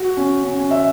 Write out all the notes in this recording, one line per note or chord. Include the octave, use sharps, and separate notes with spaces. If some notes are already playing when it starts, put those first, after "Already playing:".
Already playing: F#4
C#4
C#4
C#4
E5